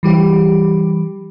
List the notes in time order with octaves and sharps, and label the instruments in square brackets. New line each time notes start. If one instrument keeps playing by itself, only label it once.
[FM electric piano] E3 G3 G4